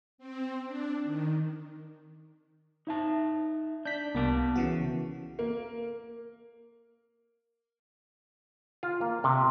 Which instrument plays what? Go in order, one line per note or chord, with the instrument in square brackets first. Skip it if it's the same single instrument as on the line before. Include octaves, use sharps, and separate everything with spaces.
[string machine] C4
D4
D#3
[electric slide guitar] D#4 E5 A5
[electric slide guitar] D4 [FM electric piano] G6 B6
[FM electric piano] C2 A#3 D6 [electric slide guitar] B3 A5
[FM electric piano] C#3 E3 F#4
[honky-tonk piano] A#3
[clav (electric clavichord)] F4
A#3
C3